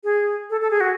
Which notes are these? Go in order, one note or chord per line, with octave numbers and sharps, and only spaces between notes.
G#4
A4
A4
G#4
F#4